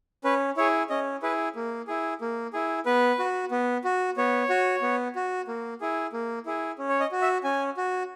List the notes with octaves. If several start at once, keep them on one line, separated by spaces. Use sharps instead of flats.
C#4 B4
E4 G#4 C#5
C#4 D#5
E4 G#4 B4
A#3
E4 G#4
A#3
E4 G#4
B3 B4
F#4
B3
F#4
B3 C#5
F#4
B3
F#4
A#3
E4 G#4
A#3
E4 G#4
C#4
C#5
D#5
F#4
E5
C#4 G#5
F#4